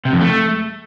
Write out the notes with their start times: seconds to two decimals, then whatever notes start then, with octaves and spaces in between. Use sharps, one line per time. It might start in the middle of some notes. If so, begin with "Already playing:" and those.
0.05 C3
0.13 F2
0.21 A3